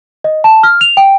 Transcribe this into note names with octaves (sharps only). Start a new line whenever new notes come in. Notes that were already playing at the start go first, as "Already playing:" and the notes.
D#5
A5
F6
F7
G5